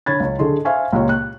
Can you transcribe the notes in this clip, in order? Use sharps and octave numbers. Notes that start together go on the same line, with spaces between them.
D3 C#5 B5 G#6 A6
C#2 C#5
D3 G#4 A4 D#5 C6
C5 E5 F5 G#5 C#6
C#2 A#2 G4 C#5
F#6